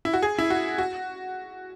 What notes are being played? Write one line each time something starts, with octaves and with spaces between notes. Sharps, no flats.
E4
F#4
G#4
E4
F#4
F#4